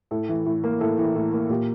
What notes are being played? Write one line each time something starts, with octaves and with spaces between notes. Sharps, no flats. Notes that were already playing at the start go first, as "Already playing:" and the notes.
A2 A4
E3
A2
A#3
A2 A4
E3
A2
A#3
A#2 G4